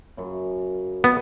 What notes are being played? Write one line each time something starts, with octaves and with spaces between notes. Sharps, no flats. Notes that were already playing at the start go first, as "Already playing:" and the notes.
F#2 C#3
B3 F#4 B4 D#5